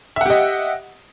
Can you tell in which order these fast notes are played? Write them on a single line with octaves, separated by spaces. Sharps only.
E5 F#5 G4 D#5